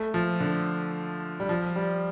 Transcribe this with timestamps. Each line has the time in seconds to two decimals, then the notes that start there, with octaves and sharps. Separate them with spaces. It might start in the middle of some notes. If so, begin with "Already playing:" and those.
Already playing: A3
0.14 F3
0.40 D3
1.40 G3
1.49 F3
1.76 G3